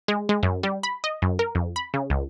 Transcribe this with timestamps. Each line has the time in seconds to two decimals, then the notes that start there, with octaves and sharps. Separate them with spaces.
0.08 G#3
0.29 G#3
0.43 F#2
0.63 G3
0.83 B5
1.04 D#5
1.22 F#2
1.39 A#4
1.55 F2
1.76 B5
1.94 C#3
2.10 C#2